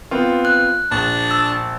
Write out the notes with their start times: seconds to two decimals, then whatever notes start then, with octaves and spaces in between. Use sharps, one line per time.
0.11 B3 C4 F4
0.45 F#6
0.91 A#1 D4
1.31 E6